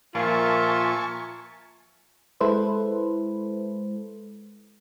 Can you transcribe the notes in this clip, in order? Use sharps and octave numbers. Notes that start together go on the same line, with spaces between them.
A#2 F3 F4 A#4 E5 G#5 A5 C#6
G#3 E4 A4 B4 C5